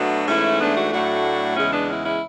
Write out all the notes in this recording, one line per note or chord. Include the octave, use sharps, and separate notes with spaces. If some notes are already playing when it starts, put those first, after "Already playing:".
Already playing: B2 F#3 A3 B3 D4
G#2 E3 A3 C#4 E4
B3 D4
D4 F#4
A2 F#3 A3 D4 F#4
E2 C#3 G#3 C#4 E4
B3 D4
C#4 E4
C#4 E4